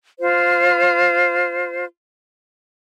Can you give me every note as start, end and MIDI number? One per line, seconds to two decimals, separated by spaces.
0.20 1.85 65
0.20 1.85 72